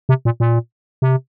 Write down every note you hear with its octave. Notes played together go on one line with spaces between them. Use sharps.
C3
A#2
A#2
C3